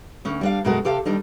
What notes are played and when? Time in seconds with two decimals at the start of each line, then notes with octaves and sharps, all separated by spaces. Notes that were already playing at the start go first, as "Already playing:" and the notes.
0.25 D2 C#4
0.41 G3 D4 F5
0.65 F#2 B2 G#3 F#4 A4 A#4
0.85 C3 G4 A4 F5
1.05 D#2 G3 D4 D#4